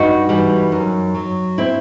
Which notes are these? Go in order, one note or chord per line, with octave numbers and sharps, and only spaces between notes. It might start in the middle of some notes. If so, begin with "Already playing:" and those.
Already playing: G2 D#4 F#4
E3 G3
F#2
F#3
C4 E4